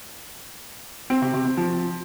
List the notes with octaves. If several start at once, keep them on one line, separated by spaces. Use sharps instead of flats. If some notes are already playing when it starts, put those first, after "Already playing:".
C4
C3
C3
C4
F3